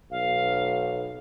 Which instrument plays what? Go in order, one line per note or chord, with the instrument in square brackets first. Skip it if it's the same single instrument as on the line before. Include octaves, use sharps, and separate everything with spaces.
[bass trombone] B1 [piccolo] F5